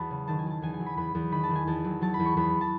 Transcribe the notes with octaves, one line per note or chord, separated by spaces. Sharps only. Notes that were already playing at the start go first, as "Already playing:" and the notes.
Already playing: E2 F#3 A5 B5
C#3
D#3 A5
G#5
F#3 A5
E2 G#5
G#5
F#3
B5
E2 B5
E2
D#3 B5
A5
D#3
G#5
E2 A5
F#3
F#3 A5
B5
E2
C#6
E2 B5
A5